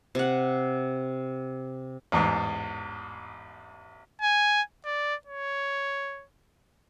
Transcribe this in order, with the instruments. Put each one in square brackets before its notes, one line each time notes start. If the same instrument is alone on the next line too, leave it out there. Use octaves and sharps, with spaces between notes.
[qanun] C3 F#5
[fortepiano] A1 E2 G#2
[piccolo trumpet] G#5
D5
C#5